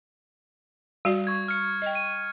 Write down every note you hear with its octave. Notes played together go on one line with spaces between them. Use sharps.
G3 F#4 D5
C#6 G#6
F6 C#7
D#5 G5
D#7